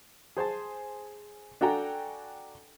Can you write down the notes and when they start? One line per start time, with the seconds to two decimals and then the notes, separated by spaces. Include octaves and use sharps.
0.37 G#4 C5 G#5 A5
1.61 D4 F#4 A4 G5 G#5 A#5